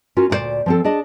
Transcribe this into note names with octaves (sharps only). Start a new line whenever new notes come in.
C#4 F4 F#4 A#4
D2 A#2 D4 C5 D5
F3 C4 A4
D4 G#4 D#5 A5